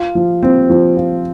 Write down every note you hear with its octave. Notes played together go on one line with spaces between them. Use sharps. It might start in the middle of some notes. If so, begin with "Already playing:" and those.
Already playing: F4
F3
C4
F3
F4